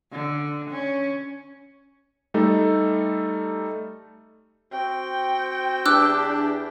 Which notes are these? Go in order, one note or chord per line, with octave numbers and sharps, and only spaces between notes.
D3
C#4
G3 A3 D#4 A4
C4 F#4 G5
E2 D4 G4 D6 E6 F#6